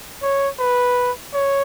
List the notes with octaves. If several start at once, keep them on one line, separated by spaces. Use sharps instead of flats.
C#5
B4
C#5